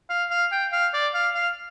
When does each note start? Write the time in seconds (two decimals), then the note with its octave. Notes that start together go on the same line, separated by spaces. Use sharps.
0.10 F5
0.30 F5
0.52 G5
0.72 F5
0.94 D5
1.14 F5
1.35 F5